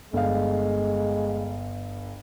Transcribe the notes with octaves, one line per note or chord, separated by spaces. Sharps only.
G1 G#3 F5